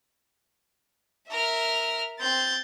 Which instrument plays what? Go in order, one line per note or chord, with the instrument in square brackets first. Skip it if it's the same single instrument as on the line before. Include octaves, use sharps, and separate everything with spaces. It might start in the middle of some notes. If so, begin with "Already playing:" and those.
[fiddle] A#4 F6 [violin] E5
[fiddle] C4 [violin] G6 A6